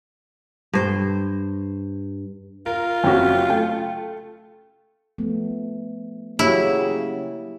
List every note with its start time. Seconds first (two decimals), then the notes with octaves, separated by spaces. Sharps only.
0.73 G2 C5
2.66 F4 A#4
3.04 F#1 C4 C#4 F#4 G4
3.50 A3 G5
5.18 F3 A3 B3
6.39 C#3 F#3 A#3 E4 G4 C#5